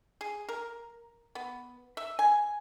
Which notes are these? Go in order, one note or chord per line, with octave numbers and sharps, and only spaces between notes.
G#4
A#4
B3
E5
G#5